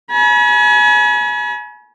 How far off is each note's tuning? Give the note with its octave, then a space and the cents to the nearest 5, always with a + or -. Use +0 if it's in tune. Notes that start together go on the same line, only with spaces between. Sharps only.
G#5 +30 B5 -45